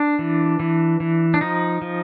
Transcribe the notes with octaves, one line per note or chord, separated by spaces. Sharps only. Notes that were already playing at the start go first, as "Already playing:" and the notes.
Already playing: D4
E3
E3
E3
D4
F3 D#4
F3